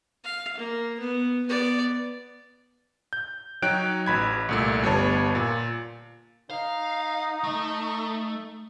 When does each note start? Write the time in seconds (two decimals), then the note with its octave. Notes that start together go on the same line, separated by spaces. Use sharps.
0.24 F5
0.57 A#3
1.00 B3
1.47 B3 D5
3.13 G6
3.62 F#3 D#4 C#5 G5 F#6 D7
4.06 A1 B5 G#6
4.49 C2 A#2 A3
4.82 G1 G3 B3 C#5 A5
5.35 A#2
6.50 D#4 F5
7.44 A3